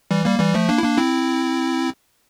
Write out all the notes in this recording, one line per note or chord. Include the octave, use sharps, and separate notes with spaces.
E3 G3
G3 A#3
E3 G3
F3 A3
A#3 D4
E4
A#3 D4
C4 E4